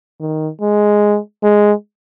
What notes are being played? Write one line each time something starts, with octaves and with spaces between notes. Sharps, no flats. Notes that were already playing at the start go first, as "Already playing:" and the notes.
D#3
G#3
G#3